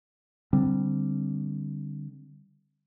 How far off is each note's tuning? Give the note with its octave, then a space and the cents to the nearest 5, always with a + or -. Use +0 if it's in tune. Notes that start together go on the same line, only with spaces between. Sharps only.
D3 +0 G3 +0 C4 +0